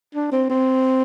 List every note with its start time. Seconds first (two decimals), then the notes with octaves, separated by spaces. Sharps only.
0.15 D4
0.32 C4
0.50 C4